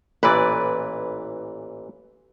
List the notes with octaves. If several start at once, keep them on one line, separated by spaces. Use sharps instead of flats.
A1 A#2 E3 B4 D5